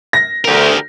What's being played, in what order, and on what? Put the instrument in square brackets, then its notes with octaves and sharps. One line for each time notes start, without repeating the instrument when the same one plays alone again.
[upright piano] A#6
[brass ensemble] D2 [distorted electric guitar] G4 A#4